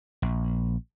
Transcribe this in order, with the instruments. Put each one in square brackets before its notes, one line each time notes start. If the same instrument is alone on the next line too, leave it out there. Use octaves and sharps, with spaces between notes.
[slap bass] A#1